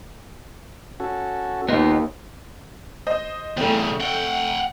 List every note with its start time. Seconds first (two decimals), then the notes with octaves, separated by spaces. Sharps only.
1.00 C#4 F#4 A4
1.69 D#2 B3 D#4 F4
3.07 C5 D#5
3.57 E2 C#3 A3 C4
4.00 F#5 G5